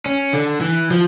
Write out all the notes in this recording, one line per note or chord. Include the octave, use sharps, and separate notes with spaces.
C#4
D3
E3
F3